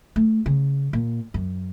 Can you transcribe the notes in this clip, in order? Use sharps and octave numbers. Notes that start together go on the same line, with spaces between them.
A3
C#3
A#2
F#2